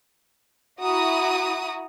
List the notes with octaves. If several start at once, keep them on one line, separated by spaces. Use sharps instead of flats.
E4 F#4 A#5 D#6